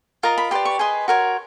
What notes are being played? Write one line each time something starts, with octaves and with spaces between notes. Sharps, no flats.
F4 A#4 D#5 A#5
B5
G4 B4 D5 C6
C#6
G#4 B4 D#5 C6
F#4 A#4 C#5